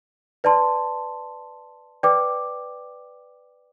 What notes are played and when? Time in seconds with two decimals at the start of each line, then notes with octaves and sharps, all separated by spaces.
0.44 B4 D5 A5 C6
2.03 B4 D5 G5 D6